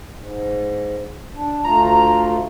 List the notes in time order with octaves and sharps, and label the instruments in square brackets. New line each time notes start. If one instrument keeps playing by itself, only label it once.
[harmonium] G#2
D4
[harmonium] D2 A3 F4 [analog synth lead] A#5